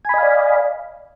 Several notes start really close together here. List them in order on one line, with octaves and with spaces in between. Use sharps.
G#5 B5 D#5 F5 D5